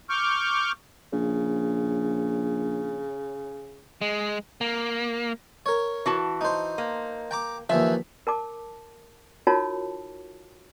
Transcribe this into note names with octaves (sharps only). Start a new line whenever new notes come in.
C#6 D6 F6 G6
A#1 C#3
G#3
A#3
A#4 C#5
E3 F#4 A5
D#4 C5
A#3
G5 A#5 D6
D#2 E3 F3 E5
A#4 A5 D6
D#4 F4 F#4 A#4 C#5 A5